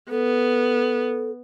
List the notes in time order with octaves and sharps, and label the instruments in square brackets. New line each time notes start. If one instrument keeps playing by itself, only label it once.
[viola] B3 [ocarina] A4